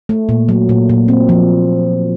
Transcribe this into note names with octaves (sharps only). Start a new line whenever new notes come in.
A3
A#2
F#3
A#2
A#2
C4
F3